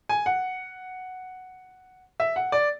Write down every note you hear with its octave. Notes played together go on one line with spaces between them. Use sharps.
G#5
F#5
E5
F#5
D5